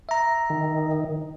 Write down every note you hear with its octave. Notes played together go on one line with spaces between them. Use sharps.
E5 A#5
D#3